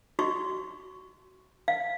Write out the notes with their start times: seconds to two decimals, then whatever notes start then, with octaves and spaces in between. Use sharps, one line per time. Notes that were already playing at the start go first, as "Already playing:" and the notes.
0.19 F#4 C#6
1.68 F5